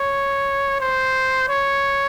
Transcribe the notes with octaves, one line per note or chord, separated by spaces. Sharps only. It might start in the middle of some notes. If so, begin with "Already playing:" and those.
Already playing: C#5
C5
C#5